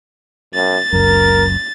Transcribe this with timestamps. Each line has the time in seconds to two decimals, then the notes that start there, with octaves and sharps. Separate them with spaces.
0.54 F#2 A6
0.93 F#1 C#2 F#2 A#4